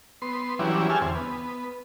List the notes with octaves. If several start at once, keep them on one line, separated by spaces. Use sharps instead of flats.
B3 C6
E3 F#3 G3 C#4 D4 E4
G4 G#4 G#5 A5 E6 F6
E2 D3 C4
B3